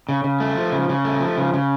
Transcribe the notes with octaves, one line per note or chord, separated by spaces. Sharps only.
C#3
C#3
A3
F3
C#3
C#3
A3
F3
C#3
C#3